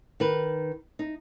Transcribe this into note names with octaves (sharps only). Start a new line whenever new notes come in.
D#3 B4
D#4